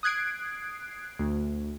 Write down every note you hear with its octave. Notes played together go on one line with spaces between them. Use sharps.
D#6 F#6 G#6 C7 D7
D2